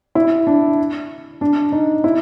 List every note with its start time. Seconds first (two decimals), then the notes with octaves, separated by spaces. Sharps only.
0.15 E4
0.47 D4
1.41 D4
1.72 D#4
2.04 E4